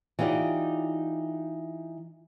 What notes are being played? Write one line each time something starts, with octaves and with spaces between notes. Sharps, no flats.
E3 D#4 F4 G4 D5